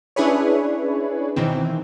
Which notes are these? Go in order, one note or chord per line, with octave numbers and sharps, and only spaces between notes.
C#4 D4 E4 G#4 B4 C#5
B2 D#3 E3 C4